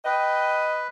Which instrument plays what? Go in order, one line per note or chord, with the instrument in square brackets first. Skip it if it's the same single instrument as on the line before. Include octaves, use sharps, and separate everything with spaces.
[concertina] B4 [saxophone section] D#5 [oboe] G5